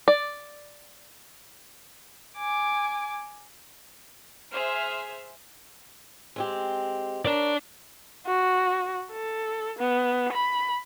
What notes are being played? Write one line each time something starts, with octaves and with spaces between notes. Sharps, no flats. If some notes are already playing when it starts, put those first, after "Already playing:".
D5
G#5 D6
G#4 C5 E5 F6
G#3 C4 G4
D4 A#4 C#5 D5 F5
F#4
A4
B3
B5